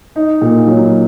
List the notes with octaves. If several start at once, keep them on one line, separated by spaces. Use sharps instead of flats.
D#4
A#2
F#3